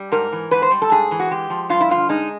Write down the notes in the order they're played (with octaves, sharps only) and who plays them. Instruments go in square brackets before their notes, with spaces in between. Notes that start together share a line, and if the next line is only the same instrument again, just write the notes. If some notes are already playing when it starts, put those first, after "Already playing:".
Already playing: [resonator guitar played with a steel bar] G3
G#2 A#4
E3
G#2 B4
C5
G3
A4
G#2 G#4
E3
F#4
G#3 G4
F3
G2 F4
E4
D3 F4
G#3 D#4